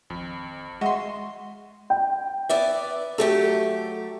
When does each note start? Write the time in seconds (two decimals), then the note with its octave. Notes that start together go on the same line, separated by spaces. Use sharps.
0.10 G#1 F2
0.81 G#3 F#4 D#5 E5 C6
1.90 G5
2.49 B3 D5 E5
3.18 F#3 A3 G4 A4